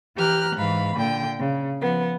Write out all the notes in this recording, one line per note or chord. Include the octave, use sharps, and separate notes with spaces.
E3 G4 A#5 F6 F#6
G#2 E3 F5 B5
A#2 D3 G5
C#3
F3 B3